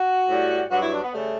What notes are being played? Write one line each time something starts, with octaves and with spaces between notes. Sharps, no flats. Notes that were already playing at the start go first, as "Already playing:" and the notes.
Already playing: F#4
A2 G3
G2 F#3 F#4
E4
D4
B3
C#3 G3 A3